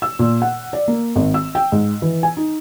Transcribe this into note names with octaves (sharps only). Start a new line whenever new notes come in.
E6
A#2
F#5
D5
A#3
G#1
E6
G5
G#2
E3
G#5
D#4